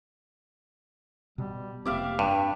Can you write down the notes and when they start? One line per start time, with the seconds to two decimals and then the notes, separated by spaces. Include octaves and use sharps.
1.38 B2 G3
1.85 F1 A#3 C4 G4 D5 E5 F5
2.19 G2 D4